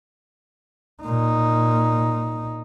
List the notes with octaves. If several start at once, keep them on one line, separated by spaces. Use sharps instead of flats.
A#2 D#4